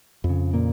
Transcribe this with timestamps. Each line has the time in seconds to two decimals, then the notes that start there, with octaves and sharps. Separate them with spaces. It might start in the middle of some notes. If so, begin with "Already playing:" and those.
0.24 F2
0.29 C#3
0.54 A#2 A#3